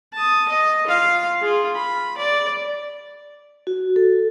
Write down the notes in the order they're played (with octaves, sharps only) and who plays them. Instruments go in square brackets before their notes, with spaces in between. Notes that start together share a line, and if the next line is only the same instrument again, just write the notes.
[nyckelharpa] A5 D#6
D#5
F4 F5
F4 G#4
B5
D5
[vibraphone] F#4
A4